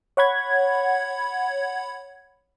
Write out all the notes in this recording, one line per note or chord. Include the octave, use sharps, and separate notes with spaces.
C#5 F#5 B5 G#6